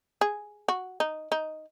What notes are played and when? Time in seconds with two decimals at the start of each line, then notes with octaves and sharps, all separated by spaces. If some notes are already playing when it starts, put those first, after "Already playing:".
0.21 G#4
0.68 F#4
1.00 D#4
1.32 D#4